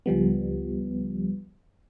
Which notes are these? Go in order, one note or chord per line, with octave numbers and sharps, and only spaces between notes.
C#2 F3 G3 B3